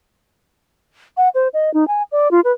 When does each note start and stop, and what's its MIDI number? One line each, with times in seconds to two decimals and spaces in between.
1.17 1.29 78
1.35 1.48 72
1.53 1.72 75
1.74 1.87 63
1.88 2.03 80
2.12 2.31 74
2.31 2.40 65
2.44 2.52 71